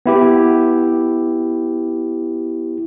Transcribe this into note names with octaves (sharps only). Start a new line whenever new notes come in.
B3 E4 G4